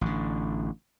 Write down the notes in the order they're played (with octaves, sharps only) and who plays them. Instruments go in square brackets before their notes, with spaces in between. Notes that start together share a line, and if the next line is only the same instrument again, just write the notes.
[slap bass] A1 D3